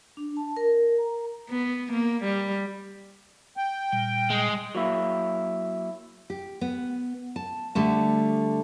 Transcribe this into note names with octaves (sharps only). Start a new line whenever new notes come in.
D4
A5
A#4
A#5
B3
A#3
G3
G5
A#2 G3
G#3
F#3 A#3 E4
G4
B3
A5
D3 G3 A3 A5